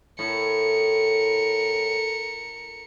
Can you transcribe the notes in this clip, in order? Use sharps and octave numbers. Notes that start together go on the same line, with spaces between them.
A2 A#4 C#7